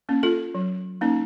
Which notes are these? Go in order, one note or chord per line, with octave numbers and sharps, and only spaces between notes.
A#3 C#4
F4 A4
F#3
A#3 C#4 D#4